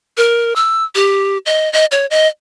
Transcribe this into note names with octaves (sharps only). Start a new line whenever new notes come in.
A#4
E6
G4
D#5
D#5
C#5
D#5